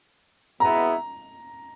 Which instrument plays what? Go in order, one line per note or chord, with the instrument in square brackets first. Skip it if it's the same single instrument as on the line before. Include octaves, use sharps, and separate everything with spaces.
[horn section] B2 G#3 B3 E4 [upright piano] A#5